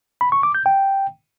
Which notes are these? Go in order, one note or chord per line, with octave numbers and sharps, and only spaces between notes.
B5
C#6
D6
G6
G5